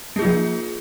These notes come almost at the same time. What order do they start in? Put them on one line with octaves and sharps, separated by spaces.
A#3 G#4 F4 F3